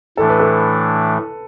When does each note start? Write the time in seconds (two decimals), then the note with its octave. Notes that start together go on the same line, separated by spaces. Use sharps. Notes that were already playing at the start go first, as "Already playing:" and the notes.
0.17 A2 E3 A3 D4 A4
0.29 B4
0.40 A4